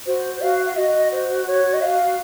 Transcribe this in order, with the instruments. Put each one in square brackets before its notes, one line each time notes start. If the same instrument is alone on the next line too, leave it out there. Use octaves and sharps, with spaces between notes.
[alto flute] F#4 [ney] C5
[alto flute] F#4 [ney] F5
[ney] F5
[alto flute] F#4 [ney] D#5
[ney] C5
C#5
D#5
F5